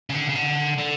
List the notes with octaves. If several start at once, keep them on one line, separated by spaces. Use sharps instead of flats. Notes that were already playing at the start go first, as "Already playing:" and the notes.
C#3
D3
C#3
D3
D3